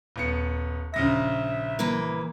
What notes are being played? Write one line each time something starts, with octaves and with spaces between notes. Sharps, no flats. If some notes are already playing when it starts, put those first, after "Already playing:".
D#1 B3 C#7
A#1 C#3 E5 A#6
E3 A#3 B4